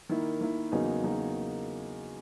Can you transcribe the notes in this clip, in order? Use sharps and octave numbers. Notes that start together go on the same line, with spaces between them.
D#3 A#3 E4
D#3 A#3 E4
E2 C#3 F#3 A#3 D#4
C#3 F#3 A#3 D#4